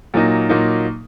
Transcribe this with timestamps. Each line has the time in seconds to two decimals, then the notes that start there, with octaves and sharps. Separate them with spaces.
0.14 A#2 F#3 A#3 D#4
0.49 A#2 F#3 A#3 D#4